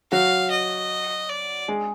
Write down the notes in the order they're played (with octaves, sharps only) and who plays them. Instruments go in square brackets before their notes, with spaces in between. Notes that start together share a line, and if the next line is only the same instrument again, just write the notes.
[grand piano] F#3 F#4 [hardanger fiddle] F5
[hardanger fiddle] D#5
D5
[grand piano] G#3 G#4